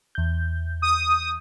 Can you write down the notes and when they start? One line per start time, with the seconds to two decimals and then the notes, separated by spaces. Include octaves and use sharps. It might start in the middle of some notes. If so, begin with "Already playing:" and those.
0.15 E2 G6
0.82 D#6